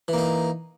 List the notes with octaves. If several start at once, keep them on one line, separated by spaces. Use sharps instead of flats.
E3 A#3 D#4